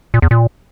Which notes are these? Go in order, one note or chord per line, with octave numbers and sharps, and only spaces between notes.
A#2
E2
A#2